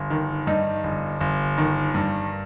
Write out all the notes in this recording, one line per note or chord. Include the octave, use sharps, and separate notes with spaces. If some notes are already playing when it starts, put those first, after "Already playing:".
Already playing: G1
D#3
G2 D#4
G1
G1
D#3
G2